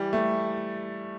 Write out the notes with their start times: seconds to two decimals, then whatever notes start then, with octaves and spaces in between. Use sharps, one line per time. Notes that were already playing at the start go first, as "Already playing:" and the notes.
Already playing: E3 G3
0.13 A3